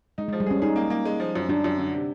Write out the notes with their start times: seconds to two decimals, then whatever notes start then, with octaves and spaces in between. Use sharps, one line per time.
0.18 G#3 D#4
0.29 G#3
0.33 F3
0.40 G3
0.46 C#4 G#4
0.62 D#4 G#4
0.76 A#3
0.90 A#3
1.05 G#3
1.20 F3
1.35 F#2
1.49 F#2 D4
1.64 F#2
1.78 D3
1.94 C3